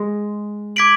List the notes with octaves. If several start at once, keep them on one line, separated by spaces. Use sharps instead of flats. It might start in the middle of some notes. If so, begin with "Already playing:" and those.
Already playing: G#3
D6 G#6 B6 D7 F#7